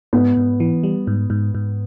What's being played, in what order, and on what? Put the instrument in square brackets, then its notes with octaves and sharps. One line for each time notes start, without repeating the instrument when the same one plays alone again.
[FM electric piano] G#2 [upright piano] B3
[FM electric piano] G#2
E3
G3
G#2
G#2
G#2